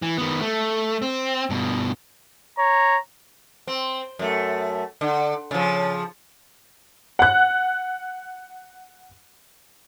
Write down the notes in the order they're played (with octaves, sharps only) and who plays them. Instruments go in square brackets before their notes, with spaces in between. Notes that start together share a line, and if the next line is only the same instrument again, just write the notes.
[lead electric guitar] E3
D#3 B3
A3
C4
G2 B2
[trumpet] C#5 [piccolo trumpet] A#5
[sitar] C4
F#2 A3
D3
C#3 F3
[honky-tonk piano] F#5 F#6